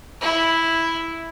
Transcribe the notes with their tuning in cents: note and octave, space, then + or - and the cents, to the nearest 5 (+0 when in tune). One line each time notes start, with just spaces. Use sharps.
E4 -5